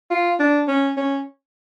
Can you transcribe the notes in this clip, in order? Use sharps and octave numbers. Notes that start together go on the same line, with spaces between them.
F4
D4
C#4
C#4